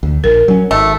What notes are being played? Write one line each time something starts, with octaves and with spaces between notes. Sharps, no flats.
D2
A#1 A#4
F#3 C#4
G#1 A3